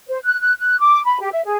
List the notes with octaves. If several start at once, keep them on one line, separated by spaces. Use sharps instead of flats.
C5
F#6
F#6
F#6
D6
B5
G4
E5
G#4